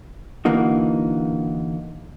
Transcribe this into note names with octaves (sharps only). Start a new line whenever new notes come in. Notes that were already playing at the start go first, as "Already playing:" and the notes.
D3 E3 A#3 D#4 F#4